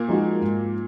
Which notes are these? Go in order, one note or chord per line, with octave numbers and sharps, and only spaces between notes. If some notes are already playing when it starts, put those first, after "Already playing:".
Already playing: A#2 A#3
F3 G#3 D#4 F#4
G#2